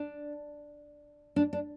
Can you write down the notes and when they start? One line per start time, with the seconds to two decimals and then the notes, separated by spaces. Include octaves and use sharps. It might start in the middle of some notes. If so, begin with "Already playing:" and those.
Already playing: D4
1.36 D4
1.53 D4